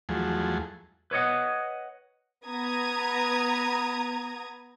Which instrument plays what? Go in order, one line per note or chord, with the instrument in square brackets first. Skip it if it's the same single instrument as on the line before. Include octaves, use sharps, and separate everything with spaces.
[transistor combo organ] E2 F3 F#3 A3 G#4
[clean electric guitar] B4 C#5 D#5 F#5
[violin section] B3 A#5 D#6 G#6